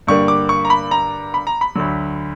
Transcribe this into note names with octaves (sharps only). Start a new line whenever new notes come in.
G2 D3 G3 A#3 C#6
D6
C#6
A#5
B5
A#5
B5
A#5
B5
D2 D3 F#3